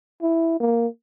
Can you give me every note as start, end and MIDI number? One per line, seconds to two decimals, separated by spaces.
0.22 0.58 64
0.60 0.87 58